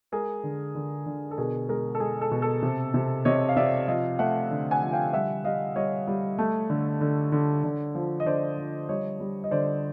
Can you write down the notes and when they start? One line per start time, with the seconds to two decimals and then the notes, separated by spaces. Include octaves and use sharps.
0.12 G#3 G#4 A#4
0.44 D3
0.75 D3
1.06 D3
1.31 A4
1.37 B2 G#4 A#4
1.69 G#3 G#4 A#4
1.95 A4
2.00 G#3 G#4
2.21 A4
2.31 B2
2.42 A4
2.62 C3
2.94 C3
3.25 C3 C#5 D#5
3.49 F5
3.57 C3 D5 E5
3.88 F3 D#5 F5
4.19 A3 E5 F#5
4.51 D3
4.71 F#5 G#5
4.82 F3
4.93 F5 G5
5.13 G3 E5 F#5
5.44 G3 D#5 F5
5.76 G3 C#5 D#5
6.07 G3
6.38 A3
6.70 D3
7.01 D3
7.32 D3
7.64 D3
7.95 F3
8.20 D#5
8.26 D3 C5 D5
8.58 F3
8.89 G3 C#5 D#5
9.20 G3
9.44 D#5
9.51 D3 C5 D5